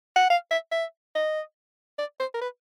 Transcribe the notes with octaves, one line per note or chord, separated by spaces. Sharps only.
F#5
F5
E5
E5
D#5
D5
C5
A#4
B4